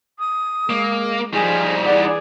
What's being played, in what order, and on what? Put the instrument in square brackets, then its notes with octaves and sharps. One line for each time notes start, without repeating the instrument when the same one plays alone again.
[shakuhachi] D#6
[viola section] G#3 [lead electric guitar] A#3
[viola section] F3 F4 [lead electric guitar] G3 D#4 [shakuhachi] G#4
[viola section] E3 G#4 D5 [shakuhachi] F#5